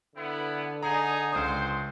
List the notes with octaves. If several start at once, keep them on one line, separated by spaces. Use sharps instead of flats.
D3 B3 E4
D#4 G#4 A#5
C#2 C5 D#6